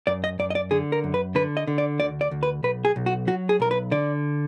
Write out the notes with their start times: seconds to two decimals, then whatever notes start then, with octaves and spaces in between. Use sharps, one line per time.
0.07 F#2 D5
0.24 D#5
0.39 F#2 D5
0.50 D#5
0.55 D5
0.71 D3 G#4
0.92 A#4
1.04 F#2
1.14 B4
1.35 D3 B4
1.57 D#5
1.67 D3
1.78 D5
1.99 D2 D5
2.21 D5
2.31 D2
2.43 B4
2.63 B1 B4
2.85 G#4
2.96 B1
3.06 F#4
3.27 F#3 F#4
3.49 G#4
3.60 B1 A#4
3.71 B4
3.91 D3 D5